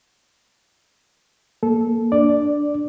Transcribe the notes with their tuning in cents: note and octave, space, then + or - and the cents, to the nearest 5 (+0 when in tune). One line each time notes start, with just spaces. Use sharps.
A#3 +0 A4 -15
D4 +0 D5 +0